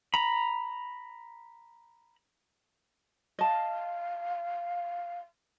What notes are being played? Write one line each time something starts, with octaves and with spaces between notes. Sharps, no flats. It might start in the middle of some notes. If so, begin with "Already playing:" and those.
A#5 B5
D#5 F5 A5